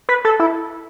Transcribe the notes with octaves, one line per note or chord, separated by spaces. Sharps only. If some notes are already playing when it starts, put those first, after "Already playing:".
B4
A4
E4